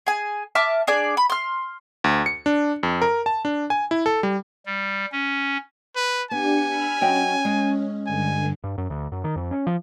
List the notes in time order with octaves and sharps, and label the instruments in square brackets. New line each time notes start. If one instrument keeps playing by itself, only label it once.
[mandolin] G#4 G#5
E5 A5 D6 F6
D4 G#4 D5
B5
C6 F6
[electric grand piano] D2
C#7
D4
F2
A#4
A5
D4
G#5
E4
A4
G3
[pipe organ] G3
C#4
[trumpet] B4
[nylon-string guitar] B3 [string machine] D4 G4 C#7 [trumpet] G#5
[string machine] B5 E6 F6
[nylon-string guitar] F#3 D#5 G5 [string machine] C#4
[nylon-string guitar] G#3
[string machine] G2 D3 [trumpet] G#5
[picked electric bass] G2
F#2
D2
F#2
D#3
F2
C#4
F3